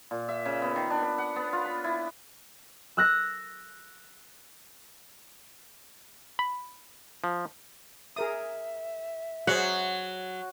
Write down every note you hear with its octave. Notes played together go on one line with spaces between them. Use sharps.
A#2
E5
C#3
B3
D#3
D4
B4
F#5
B3
F4
B5
E4
E6 F#6 A#6
B5
F3
G#4 A#4 E5 D#6
F#3 F#4 G#4 C5 F#5